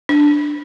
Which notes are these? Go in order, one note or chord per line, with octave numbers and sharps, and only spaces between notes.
D4